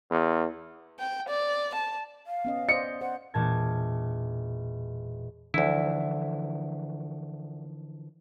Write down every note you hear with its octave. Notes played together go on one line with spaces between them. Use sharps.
E2
G5
D5
A5
F5
B3 C#4 D#5
C5 D5 D#5 C#7
C5 F#5
E1 A#2 A5 G#6
D2 D3 E3 F3 E4